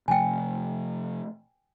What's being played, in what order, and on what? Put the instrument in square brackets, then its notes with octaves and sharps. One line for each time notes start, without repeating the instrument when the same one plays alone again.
[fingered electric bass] C3 F3 A3 [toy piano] G5 G#5